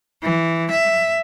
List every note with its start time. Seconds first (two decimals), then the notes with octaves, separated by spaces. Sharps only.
0.23 E3
0.71 E5